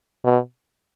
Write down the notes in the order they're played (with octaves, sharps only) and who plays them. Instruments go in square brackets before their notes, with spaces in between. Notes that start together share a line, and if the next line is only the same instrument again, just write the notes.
[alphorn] B2